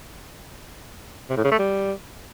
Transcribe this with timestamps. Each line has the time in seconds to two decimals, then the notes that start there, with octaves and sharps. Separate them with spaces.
1.30 C3
1.37 A2
1.44 C#3
1.51 A3
1.59 G3